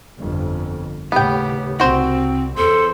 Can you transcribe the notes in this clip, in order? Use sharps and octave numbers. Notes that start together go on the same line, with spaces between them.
G1 F2
D#2 A2 C#3 B3 G4 G5
C2 C4 F#4 C5
E2 A4 C5